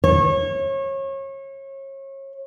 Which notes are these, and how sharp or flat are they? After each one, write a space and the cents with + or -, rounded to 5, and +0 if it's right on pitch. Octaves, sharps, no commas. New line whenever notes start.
C#5 -30